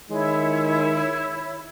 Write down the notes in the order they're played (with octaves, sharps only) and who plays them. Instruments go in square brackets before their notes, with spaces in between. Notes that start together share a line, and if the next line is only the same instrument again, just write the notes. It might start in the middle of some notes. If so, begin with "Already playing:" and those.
[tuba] D#3 [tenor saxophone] G#3 [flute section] E4 C#5